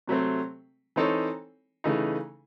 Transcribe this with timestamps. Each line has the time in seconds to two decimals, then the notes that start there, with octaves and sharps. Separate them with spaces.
0.08 C3 F#3 A3 C4
0.96 E3 C4 D#4 A4 C#5
1.84 C#3 E3 A3 D#4